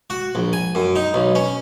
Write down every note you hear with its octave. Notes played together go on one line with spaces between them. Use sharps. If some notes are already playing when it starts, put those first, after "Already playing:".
F#4
A#1
G#5
F#2
D#4
B1
C#4